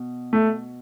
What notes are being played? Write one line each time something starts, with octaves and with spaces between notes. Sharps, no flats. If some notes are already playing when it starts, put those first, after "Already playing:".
Already playing: B2
A3